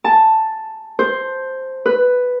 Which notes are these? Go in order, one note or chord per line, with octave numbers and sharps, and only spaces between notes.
A5
C5
B4